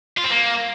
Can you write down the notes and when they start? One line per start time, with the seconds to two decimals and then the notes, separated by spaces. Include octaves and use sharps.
0.18 F4
0.24 C4
0.31 A#3